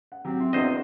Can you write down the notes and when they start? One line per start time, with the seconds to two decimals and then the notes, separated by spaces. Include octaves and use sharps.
0.12 F#5
0.25 F#3 C4 G4
0.40 E4 C6
0.53 E2 D4 F#4 A#4 C5 D#5